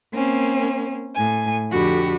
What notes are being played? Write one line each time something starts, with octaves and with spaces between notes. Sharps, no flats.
A#3 C4 C#4
A2 G#5
F2 D3 F#4 G4 B5